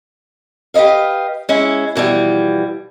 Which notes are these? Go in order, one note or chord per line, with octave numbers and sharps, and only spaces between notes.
G4 B4 C#5 D#5 F5
G#3 C#4 E4
B2 E3 F3 G3